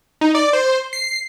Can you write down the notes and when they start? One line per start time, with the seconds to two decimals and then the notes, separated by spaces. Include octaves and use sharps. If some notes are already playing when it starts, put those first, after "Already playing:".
0.21 D#4
0.35 D5
0.53 C5
0.93 C7